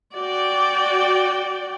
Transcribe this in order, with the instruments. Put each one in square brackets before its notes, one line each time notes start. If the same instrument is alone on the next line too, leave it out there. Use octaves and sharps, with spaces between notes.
[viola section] F#4 D5 G5